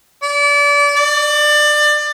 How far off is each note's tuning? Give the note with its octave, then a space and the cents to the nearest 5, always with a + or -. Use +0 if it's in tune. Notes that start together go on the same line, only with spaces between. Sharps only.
D5 -30
D5 +25